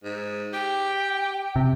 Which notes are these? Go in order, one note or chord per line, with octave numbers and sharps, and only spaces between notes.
G#2
G4 G5
C3